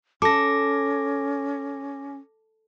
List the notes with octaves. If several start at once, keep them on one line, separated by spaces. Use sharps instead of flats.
C#4 A4 D6 A#6